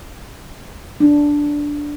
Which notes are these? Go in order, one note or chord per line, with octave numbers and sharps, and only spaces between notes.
D4